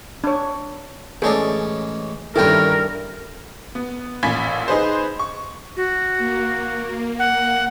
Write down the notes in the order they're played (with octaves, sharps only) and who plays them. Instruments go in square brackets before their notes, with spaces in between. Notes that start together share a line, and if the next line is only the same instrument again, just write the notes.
[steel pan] D4 C#5
[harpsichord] A1 G#3 C#4 [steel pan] G#4 A4 D5
[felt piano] G2 A4 [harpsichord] D#3 C#4 [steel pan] E4 G5 [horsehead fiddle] A#4
[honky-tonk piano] B3
A1 A#2 B5 G#6 B6
D#4 G#4 B4 C5
C#6
[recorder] F#4
[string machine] A#3
[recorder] F#5